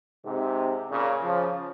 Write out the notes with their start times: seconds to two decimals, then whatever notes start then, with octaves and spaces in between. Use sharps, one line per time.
0.26 G#2 C3
0.91 A#2 C#3
1.23 C#3 F3